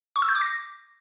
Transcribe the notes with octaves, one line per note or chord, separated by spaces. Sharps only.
C#6
E6
G6
D6
A#6